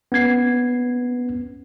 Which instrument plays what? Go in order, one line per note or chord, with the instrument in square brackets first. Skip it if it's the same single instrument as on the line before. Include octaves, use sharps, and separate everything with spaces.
[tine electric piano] B3 C#4 G#6 C7